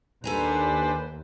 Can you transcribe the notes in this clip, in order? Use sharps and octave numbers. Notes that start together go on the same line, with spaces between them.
D#2 D4 A4 B4 C5 G#5 A#5